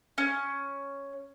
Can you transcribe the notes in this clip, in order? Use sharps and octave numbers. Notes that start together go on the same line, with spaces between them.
C#4